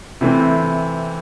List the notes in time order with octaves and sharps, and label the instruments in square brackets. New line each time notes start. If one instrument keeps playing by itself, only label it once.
[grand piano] C3 E3 A3 C4